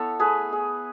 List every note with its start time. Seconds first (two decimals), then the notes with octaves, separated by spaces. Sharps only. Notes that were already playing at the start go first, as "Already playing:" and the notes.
Already playing: B3 E4 A4 C#5
0.19 A3 G#4 B4
0.52 E4 G#4